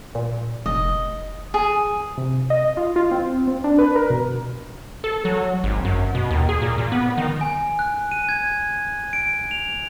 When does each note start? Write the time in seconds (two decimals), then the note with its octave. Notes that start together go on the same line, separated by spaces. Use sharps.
0.15 A#2
0.66 F1 D#5
1.54 G#4
2.17 C3
2.50 D#5
2.77 F4
2.96 F4
3.11 C4
3.47 C4
3.64 D4
3.78 B4
3.95 A#4
4.10 B2
5.04 A4
5.25 F#3
5.64 G#1
5.85 F#2
6.15 B2
6.31 D#2
6.49 G#4
6.62 A#2
6.78 A#2
6.92 B3
7.18 D#3
7.41 G#5
7.79 F#6
8.12 D#7
8.29 G#6
9.13 D7
9.51 F7